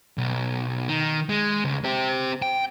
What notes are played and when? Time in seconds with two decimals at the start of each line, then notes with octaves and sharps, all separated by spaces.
0.18 B1
0.88 D#3
1.29 G#3
1.65 C#2
1.85 C4 G4
2.42 G5